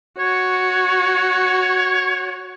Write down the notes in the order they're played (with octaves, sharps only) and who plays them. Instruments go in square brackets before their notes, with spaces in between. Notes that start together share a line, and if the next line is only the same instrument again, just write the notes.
[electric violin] F#4 [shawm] C#5